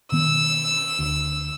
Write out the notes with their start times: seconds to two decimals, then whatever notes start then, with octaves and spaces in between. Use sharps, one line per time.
0.12 B2 D#3 B3 E6
0.99 D2